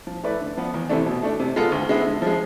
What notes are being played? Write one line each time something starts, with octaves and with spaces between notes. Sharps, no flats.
F3
A3 E4 B4 D5
D3
F3 B3
E2
C3 E3 A3 D4
B2
A3 D4
C3
G#3 B3 F4 A4
D2
D3 G#3 B3 E4
D3
F3 G#3